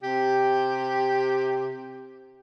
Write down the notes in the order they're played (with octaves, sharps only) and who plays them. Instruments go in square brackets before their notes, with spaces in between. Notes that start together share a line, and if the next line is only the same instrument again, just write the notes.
[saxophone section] C3 G4